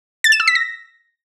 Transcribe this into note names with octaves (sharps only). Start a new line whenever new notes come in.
A6
E7
E6
B6
A#6